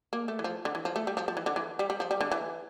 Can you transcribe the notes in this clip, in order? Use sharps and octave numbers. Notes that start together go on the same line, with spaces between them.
A#3
A3
E3
F3
D3
E3
F3
A3
G3
F3
F3
E3
D3
E3
G3
G3
F3
G3
D3
E3